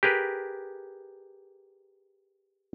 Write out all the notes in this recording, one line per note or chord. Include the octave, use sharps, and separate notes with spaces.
G4 G#4 A#4 B4